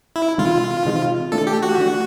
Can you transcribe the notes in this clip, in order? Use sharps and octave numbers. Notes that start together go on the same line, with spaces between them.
E4
C3 E3 G#3 C4 D#4 F4
C3 E3 G#3 C4 D#4
E3 A3 D4 A4
G4
F#4
E3 A3 D4